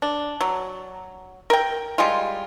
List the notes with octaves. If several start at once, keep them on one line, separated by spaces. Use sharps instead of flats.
D4
F#3
A#4 G5
G3 G#3 F4